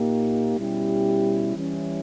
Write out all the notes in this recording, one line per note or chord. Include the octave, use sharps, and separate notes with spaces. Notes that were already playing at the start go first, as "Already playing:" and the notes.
Already playing: A#2 A#3 D#4 G4
B2 G3 C#4 E4 G4
E3 G3 C#4 E4